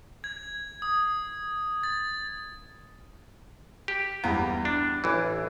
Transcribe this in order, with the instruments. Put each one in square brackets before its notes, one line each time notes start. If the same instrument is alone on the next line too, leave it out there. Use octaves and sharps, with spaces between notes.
[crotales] G#6
D#6
A6
[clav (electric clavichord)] G4
[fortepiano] E2 G3
[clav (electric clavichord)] D4
A1 E3